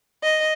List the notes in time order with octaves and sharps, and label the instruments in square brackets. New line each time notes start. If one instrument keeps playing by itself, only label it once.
[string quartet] D#5